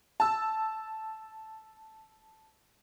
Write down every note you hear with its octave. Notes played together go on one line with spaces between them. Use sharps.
A5 E6